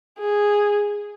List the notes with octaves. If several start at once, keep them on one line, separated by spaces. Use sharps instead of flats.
G#4